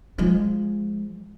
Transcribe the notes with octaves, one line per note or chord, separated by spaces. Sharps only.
F3 G#3